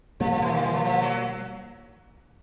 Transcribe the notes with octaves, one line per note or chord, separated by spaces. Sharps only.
B2 F3 G3 A#3
F3
E3
D#3
E3
F3
F3
F#3